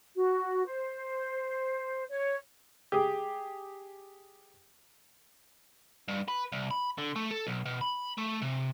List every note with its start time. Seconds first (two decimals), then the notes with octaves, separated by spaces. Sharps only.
0.16 F#4
0.66 C5
2.09 C#5
2.92 G4 G#4
6.09 G2
6.28 B4
6.52 C2
6.71 B5
6.98 D3
7.16 A3
7.31 A4
7.47 B1
7.65 B2
7.81 B5
8.18 A3
8.42 C3